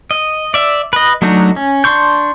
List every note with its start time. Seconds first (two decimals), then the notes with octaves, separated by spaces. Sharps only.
0.11 D#5
0.54 D5 E5
0.93 B4 D#5
1.22 F#3 A3 D4 D#4 F#4
1.56 C#4
1.84 D4 C6 C#6 G6